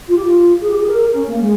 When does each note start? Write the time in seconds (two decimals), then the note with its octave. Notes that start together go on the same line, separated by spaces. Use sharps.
0.08 F4
0.16 G4
0.26 F4
0.61 G#4
0.69 G4
0.77 G#4
0.88 A#4
1.14 C#4
1.27 A#3
1.40 G#3